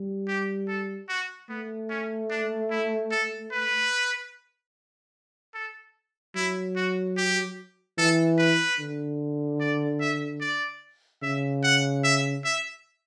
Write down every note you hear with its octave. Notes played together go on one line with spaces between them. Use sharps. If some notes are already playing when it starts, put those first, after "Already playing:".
Already playing: G3
G4
A4
F#4
A3 B3
C#4
D4
E4
A4
B4
A4
F#3 E4
F#4
G4
E3 A4
B4
D3
D5
E5
D5
C#3 E5
F#5
E5
E5